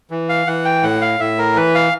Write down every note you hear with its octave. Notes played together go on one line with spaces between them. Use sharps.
E3
F5
E3 F#5
G5
A2 F#5
F5
A2 E5
A#4
E3 B4
F5